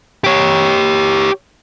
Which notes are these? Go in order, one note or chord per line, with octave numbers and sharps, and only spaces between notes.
G4 C#5